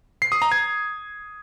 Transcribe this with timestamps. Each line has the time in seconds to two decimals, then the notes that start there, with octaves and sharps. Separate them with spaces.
0.22 C7
0.32 D#6
0.42 A#5
0.52 G#6